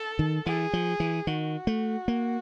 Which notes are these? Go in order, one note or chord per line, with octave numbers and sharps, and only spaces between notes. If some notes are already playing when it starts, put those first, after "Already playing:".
Already playing: A4
D#3
E3 G#4
F3
E3
D#3 F#4
A3
A#3